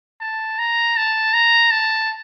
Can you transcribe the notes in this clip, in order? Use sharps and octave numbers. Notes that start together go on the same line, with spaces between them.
A5
A#5
A5
A#5
A5